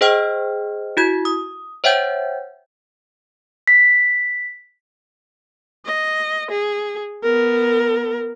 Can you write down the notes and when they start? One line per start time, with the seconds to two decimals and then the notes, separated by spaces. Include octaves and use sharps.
0.01 G#4 C5 D#5 G5 F6
0.97 E4 F#4 G#6
1.25 D#6
1.84 C5 C#5 E5 F#5 G5 G6
3.67 B6
5.86 D#5
6.51 G#4
7.23 B3 A#4